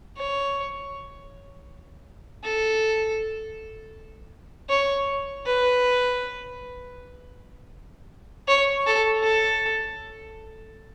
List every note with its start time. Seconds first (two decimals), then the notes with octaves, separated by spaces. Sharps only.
0.17 C#5
2.44 A4
4.70 C#5
5.46 B4
8.48 C#5
8.86 A4
9.23 A4